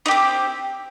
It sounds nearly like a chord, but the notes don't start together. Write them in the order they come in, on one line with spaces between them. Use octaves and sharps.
D#4 G4 C4